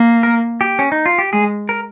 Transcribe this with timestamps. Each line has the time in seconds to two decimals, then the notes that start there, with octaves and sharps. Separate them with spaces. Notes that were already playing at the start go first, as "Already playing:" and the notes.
Already playing: A#3
0.23 A#4
0.61 G4
0.79 C#4
0.92 D#4
1.06 F4
1.18 G4
1.33 G#3 G#4
1.69 A#4